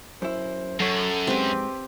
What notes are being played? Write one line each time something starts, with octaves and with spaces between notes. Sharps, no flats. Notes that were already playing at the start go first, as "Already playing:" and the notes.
F#2 E4 C5
F#2 F#3 A4 C#5
G#2 C4 G4 B4